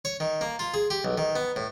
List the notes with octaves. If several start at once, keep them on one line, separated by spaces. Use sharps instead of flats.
C#5
D#3
A#3
F4
G#4
G4
B1
D#3
B3
A2